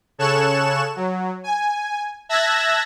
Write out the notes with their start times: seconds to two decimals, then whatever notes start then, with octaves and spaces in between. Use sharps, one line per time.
0.18 C#3 A4 C#5 C#6 F#6 E7
0.96 F#3
1.44 G#5
2.29 E5 A5 E6 F#6 G#6 A#6